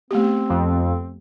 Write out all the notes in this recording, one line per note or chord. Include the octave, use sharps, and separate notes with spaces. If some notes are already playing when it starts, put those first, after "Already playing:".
A3 B3 C4 G4
F2